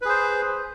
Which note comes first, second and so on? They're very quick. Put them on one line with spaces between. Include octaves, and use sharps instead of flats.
B4 G#4 C5